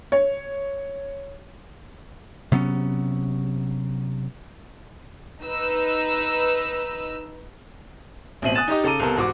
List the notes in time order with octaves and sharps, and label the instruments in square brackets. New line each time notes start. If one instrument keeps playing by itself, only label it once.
[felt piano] C#5
[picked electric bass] C3 F#3 B3 C#4
[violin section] D#4 B4 E6
[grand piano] A1 B2 C4 E5 D#7 F#7
G#5 D#6 F#6 A6 E7
D#4 G4 D#5
C#3 A4 A#5 D6 D#7
C2 B3 A4 A#4
E2 G#2 F#4 D6